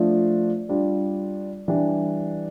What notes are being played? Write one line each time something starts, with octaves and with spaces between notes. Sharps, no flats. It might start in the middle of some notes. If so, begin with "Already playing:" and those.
Already playing: F3 A3 D4 F4
G3 D4 F4
E3 G3 D4 G4